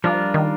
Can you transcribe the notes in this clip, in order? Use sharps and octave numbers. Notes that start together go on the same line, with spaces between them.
F3 G3 D4 F4 A#4
D#3